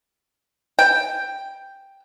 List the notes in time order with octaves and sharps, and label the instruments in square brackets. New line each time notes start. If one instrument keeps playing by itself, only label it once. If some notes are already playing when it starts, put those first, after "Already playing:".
[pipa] G5